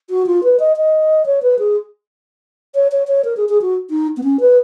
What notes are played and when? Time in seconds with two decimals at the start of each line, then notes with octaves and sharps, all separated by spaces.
0.10 F#4
0.26 F4
0.44 B4
0.59 D#5
0.76 D#5
1.26 C#5
1.43 B4
1.59 G#4
2.75 C#5
2.92 C#5
3.07 C#5
3.25 A#4
3.37 G#4
3.49 G#4
3.61 F#4
3.90 D#4
4.17 B3
4.23 C#4
4.40 B4